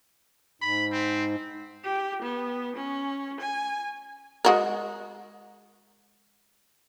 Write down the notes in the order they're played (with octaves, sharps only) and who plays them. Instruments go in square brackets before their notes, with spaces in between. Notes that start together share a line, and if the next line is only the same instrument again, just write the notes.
[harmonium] G#2 [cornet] B5
[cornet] C4
[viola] G4
B3
C#4
G#5
[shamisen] G#3 F#4 A#4